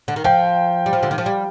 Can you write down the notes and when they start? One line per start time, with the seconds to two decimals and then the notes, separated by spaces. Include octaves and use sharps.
0.08 D3
0.16 D#3
0.24 F3 G5
0.86 G3
0.93 F3
1.03 D3
1.11 D#3
1.18 F3
1.26 G3